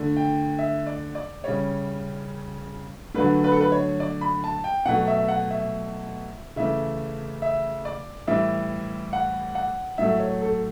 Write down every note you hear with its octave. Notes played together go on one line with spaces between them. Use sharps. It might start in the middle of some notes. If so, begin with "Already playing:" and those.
Already playing: D3 A3
G5
E5
D5
D5
C#3 G3 C#5
D3 F#3 A3 B4
B4
A4
B4
C#5
D5
B5
A5
G5
B2 F#3 A3 F#5
E5
F#5
E5
C#3 E3 A3 E5
E5
D5
A2 E3 G3 E5
F#5
F#5
A2 F#3 A3 E5
C#5
A4